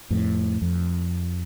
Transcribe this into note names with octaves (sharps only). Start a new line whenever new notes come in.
F2 A2
F2